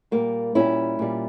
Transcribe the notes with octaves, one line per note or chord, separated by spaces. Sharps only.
A#2 G3 A#3
A#2 G3 C#4 E4
A#2 G3